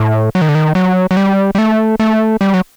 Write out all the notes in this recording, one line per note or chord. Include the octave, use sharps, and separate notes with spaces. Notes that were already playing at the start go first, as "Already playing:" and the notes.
Already playing: A2
F#3
D#3
D3
D#3
F#3
F#3
G3
G3
A3
A3
G3
F#3